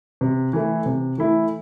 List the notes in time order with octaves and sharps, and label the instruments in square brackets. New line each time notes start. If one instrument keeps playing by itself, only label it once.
[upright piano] C3
E3 A3 E4
C3
E3 A3 E4